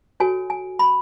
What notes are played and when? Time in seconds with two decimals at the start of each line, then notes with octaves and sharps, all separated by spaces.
0.20 F#4 A4 C#5 G#5
0.50 G#5
0.79 B5